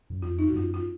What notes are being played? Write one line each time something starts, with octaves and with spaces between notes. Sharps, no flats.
F#2
F2 F4
D#4
F#4
G2
F#2 F4
F4